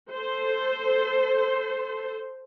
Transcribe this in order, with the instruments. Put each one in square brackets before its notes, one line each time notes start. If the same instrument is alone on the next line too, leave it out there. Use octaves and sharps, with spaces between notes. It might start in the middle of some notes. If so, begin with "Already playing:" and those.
[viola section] A4 C5